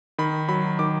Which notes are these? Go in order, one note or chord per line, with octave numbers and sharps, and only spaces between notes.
D#3 B5
F#3 B5
D#3 D6